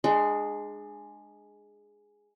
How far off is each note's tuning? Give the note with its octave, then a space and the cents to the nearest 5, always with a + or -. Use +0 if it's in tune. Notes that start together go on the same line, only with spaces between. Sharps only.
G#3 +0 D4 +30 F#5 +40